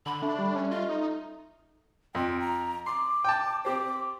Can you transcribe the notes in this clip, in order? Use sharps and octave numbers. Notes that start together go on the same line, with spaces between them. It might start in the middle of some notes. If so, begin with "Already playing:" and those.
D3 B5
A3 D4
G3
C#4
F4 D#5
D#4
F2 G5
A#5
C6 D6
G5 A5
C4 G4 C5 D6